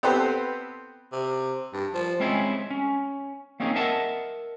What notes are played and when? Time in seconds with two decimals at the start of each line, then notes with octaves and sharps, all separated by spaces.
0.03 B3 C4 G4 A4 B4 C5
1.12 C3
1.73 G2
1.94 F3
2.20 G#3 C4 C#4 E4 G#4
2.70 C#4
3.60 A#3 C4 C#4 D#4 G#4
3.75 A#4 D#5 E5 F#5 A5